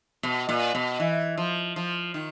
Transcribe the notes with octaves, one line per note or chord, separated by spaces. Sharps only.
B2
A#2
B2
E3
F3
F3
D#3